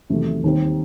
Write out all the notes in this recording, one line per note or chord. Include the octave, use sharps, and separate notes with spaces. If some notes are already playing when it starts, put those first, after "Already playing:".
E2 C3 D#3 F#3 A3
D#2 D#3 G3 C4